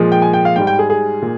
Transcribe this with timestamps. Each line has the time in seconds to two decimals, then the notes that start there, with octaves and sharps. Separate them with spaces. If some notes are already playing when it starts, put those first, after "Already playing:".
Already playing: A#2 F3 G#3
0.12 G5
0.22 G#5
0.33 G5
0.45 F5
0.56 G#2 G3 G5
0.67 G5
0.79 G#4
0.90 G#4
1.22 A#2